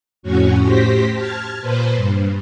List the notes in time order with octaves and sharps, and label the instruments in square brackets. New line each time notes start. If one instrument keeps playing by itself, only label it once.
[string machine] F2 A2 C#4 F#4 C#6
A2 G4 C5 A#6 B6
A5 F6 G#6
A#2 B4 C5
G2